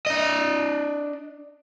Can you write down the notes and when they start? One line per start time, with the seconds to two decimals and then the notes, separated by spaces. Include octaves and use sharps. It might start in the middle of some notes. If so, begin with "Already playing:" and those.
0.06 D4 D#5